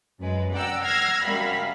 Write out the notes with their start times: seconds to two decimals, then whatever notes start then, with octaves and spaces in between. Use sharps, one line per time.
0.20 F#2 G#3 B4
0.53 D5 F#5 G5 A#5 E6
0.84 F#5 E6 F6 G#6 A#6 C7
1.23 F#2 G3 F5 B5